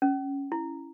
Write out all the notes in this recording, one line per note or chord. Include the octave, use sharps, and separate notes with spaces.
C#4
E4